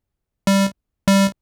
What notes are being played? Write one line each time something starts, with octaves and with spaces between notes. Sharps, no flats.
G3
G3